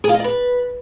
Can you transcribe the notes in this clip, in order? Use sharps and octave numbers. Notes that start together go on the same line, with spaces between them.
G#4
F4
D#5
D5
B4